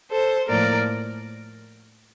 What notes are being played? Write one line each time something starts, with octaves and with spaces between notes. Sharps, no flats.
A4 C5
A2 F3 A#3 A#4 D5